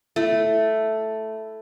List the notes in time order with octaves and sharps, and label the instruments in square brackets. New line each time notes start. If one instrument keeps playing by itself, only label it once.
[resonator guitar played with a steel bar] A3 [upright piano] E4